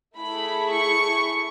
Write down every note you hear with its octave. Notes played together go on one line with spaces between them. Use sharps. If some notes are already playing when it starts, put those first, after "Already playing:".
A3 E4 G#4 B5
C#6